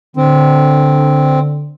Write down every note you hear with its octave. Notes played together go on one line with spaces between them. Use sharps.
D3 C4